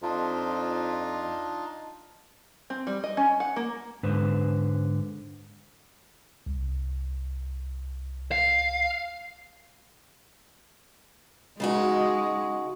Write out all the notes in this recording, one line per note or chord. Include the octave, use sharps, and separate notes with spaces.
F2 D4 D#4 F4
C4
G3
D#5
C#4
F#5
A#3
G#2 D3 B4 C5
C2
F5
C#3 G#3 D#4 F#4